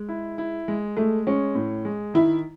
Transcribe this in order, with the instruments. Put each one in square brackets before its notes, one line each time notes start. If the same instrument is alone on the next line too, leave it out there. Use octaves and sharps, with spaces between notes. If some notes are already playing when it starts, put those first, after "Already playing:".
Already playing: [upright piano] G#3
[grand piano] E4
E4
G#3
[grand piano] G#3 [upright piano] A3
[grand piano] G#3 [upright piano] C#4
[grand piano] A2
G#3
[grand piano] D#3 [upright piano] E4